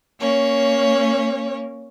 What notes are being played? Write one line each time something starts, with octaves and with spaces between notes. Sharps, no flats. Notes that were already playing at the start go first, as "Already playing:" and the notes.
A#3 C#4 C#5